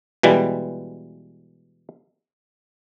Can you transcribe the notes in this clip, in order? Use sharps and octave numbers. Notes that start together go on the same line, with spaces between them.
B2 E3 G3 G#3